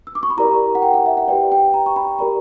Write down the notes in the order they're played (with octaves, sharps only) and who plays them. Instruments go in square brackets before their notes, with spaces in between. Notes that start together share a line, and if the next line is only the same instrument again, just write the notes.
[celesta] E6
D6
C#6
B5
E4 G4 A#4 D5 A#5
F#5
G5
F#5
E5
F#5
G4 B4 D5 G5
G5
A#5
C#6
B5
G4 A#4 D5 A#5